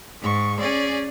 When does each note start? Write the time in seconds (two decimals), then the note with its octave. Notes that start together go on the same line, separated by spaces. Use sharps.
0.22 G#2 C#6
0.59 C#4 G#4 D5